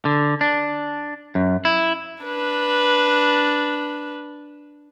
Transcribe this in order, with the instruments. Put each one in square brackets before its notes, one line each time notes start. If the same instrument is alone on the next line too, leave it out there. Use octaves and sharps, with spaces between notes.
[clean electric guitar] D3
D4
F#2
E4
[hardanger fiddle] D4 B4